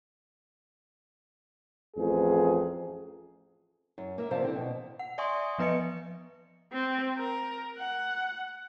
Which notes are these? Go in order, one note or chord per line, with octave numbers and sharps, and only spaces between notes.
A1 F2 G#4
F#2
A#3 A#4 E5
G2 C3 F3 C5 F5 A5
D3 E3 C4
B2
F#5
D5 E5 G#5 C6 C#6 D#6
F3 B3 B4 D#5 C#7
C4
A#4
F#5